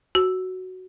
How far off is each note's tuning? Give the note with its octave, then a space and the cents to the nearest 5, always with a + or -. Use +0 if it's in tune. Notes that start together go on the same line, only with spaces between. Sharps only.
F#4 +5